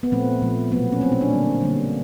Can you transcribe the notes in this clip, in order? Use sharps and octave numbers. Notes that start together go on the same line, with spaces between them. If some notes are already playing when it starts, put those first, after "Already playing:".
B3
A#2 F3 A3 C4
A#2 F3 A3
B2 F#3 A3 B3
C#4
B2 F#3 A3 C4
C#4
D4
D3 G3 A#3
D3 G3 A#3